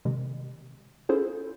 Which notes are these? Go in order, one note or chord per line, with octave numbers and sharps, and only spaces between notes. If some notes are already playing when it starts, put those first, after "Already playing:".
C3 D#3 G#3
C#4 E4 F4 G#4 A4 C5